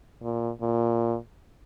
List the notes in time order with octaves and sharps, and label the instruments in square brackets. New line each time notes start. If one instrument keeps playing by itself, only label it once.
[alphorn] A#2
A#2